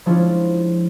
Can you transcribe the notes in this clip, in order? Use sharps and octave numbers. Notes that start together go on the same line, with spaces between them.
F3 G#3 C#4 D4 E4 F4